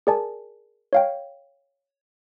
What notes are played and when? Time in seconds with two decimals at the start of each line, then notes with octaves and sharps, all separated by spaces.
0.07 G#4 A#4 D5 G#5 A5
0.93 C#5 F5 G5